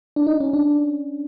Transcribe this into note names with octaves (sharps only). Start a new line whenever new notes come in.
D4
D#4
C#4
D4